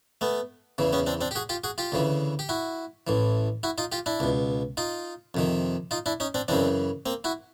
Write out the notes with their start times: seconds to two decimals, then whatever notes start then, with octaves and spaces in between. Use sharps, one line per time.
0.21 A3 B3
0.78 E2 C#3 E3
0.93 B3 C#4
1.06 C4 D4
1.21 C4 D4
1.31 G4
1.36 F#4 G#4
1.49 F4 G4
1.64 F#4 G#4
1.78 F4 G4
1.92 D2 C#3 E3
2.39 G4
2.49 E4 F#4
3.07 A1 A2 E3
3.63 E4 F#4
3.78 D#4 F4
3.92 F4 G4
4.06 D4 E4
4.20 C#2 B2
4.77 D#4 F4
5.34 F2 C3 D#3
5.91 D#4 F4
6.06 D4 E4
6.20 C#4 D#4
6.34 C4 D4
6.48 F#2 C#3 E3 C4 D4
7.06 A#3 C4
7.24 E4 F#4